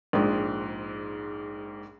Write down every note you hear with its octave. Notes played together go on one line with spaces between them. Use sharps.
A#1 G#2